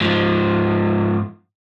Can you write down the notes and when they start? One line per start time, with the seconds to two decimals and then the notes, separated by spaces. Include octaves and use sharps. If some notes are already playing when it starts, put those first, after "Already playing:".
0.01 G#2 F3